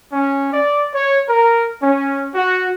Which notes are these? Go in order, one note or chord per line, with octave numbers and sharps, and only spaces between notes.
C#4
D5
C#5
A#4
C#4
F#4